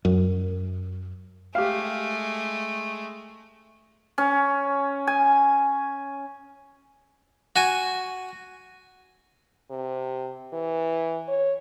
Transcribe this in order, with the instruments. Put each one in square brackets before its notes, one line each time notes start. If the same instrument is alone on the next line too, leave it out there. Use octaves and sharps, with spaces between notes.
[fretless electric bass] F#2
[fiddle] G#3 A3 [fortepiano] G4 F5
[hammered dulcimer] C#4
G#5
[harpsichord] F#4 G#5
[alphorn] C3
E3
C#5